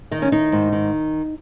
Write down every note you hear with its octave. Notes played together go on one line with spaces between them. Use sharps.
D#3 D#4
C#4
D#3 D#4
G#2
D#3